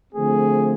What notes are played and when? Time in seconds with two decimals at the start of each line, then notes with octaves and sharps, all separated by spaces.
0.14 D3 F3 A3 C4 G#4